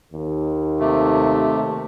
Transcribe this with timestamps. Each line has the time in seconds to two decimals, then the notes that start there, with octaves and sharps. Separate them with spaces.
0.13 D#2
0.80 C3 A3